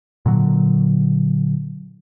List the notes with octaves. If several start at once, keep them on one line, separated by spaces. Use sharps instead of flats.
A#2 D3 F#3